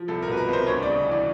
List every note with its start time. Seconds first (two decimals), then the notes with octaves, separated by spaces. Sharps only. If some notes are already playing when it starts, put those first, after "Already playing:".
Already playing: F3
0.08 C2 A4
0.22 A#4
0.28 B2 B4
0.37 A#4
0.48 C2 C5
0.67 D2 C#5
0.83 D5
0.88 C#3
1.08 E3 D5